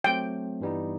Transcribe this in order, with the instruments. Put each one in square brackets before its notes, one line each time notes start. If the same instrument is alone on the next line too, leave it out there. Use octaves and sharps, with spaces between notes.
[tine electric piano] F#3 A3 C4 [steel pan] G5
[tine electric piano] G2 E3 G3 B3 D#4